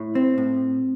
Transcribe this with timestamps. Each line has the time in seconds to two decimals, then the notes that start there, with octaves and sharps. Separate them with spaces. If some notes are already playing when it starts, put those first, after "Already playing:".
Already playing: A2
0.15 C4
0.38 A2